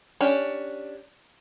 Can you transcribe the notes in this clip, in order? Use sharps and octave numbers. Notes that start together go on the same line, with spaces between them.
C#4 D4 G4